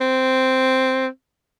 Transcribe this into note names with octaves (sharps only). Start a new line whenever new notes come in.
C4